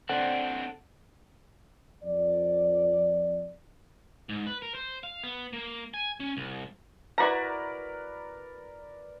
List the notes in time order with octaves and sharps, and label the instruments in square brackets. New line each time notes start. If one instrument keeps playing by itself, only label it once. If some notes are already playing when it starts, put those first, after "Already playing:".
[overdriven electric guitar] C4 D4 [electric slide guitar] A4 F#5
[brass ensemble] F2 D5
[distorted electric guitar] G#2
B4
A#4
C5
F5
B3
A#3
G#5
C#4
C2
[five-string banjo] E4 F#4 A#5 [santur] A#4 B4 D5